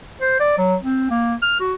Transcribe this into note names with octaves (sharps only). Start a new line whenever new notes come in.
C5
D5
F#3
C4
A#3
F6
F#4